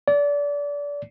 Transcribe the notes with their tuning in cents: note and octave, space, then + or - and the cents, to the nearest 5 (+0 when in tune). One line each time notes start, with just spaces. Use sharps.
D5 -30